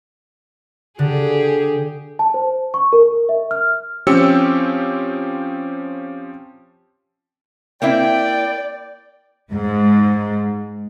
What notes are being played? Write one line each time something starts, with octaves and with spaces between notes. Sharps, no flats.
D3 G4 G#4
A5
C5
C#6
A#4
E5
F6
F3 C4 C#4 G4 E6 C#7
A#3 C4 E4 D5 G5
G#2